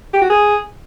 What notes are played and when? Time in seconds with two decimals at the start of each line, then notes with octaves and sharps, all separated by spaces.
0.13 G4
0.22 F#4
0.30 G#4